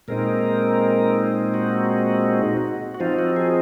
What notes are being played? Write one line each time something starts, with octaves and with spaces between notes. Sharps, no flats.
A#2 G#3 C4 D#4 A#4
F#4
F#4
F3 C4 D#4 F4
F#4
G#4